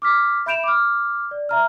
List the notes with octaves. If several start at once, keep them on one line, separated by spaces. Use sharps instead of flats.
D6 F6 B6
E5 B5 G6 D7 E7 F7
D6 F6
D5
E5 A#5 F6